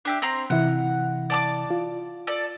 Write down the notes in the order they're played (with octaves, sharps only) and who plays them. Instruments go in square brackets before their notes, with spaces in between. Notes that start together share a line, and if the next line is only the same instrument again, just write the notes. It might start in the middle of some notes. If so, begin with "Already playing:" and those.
[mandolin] D4 G4 E5
C4 A#5 C6
[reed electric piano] C3 E3 E4 [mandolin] F#5
[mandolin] D5 A5 D6
[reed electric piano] F4
[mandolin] A4 D5